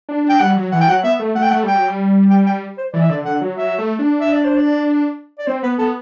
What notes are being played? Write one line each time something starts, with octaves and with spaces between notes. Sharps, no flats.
D4
D4
G5
G3 F#5
F#3
E3 F#5
G5
F#3 F#5
B3 E5
A3
A3 F#5
G5
A3 F#5
G3 G5
F#3
G3
G5
G5
C5
E3 D5
E5
D3 D5
D3 F#5
F#3
F#3 E5
A3
D4
E5
D5
C5
D5
D5
C4 C5
B3 B4
B3 A4